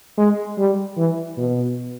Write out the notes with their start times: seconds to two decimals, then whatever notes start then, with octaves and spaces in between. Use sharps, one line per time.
0.18 G#3
0.58 G3
0.98 E3
1.38 B2